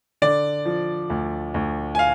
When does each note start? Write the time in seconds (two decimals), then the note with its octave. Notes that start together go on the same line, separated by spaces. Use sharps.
0.22 D3 D5
0.66 F3
1.10 D2
1.54 D2
1.95 G#5
1.99 F5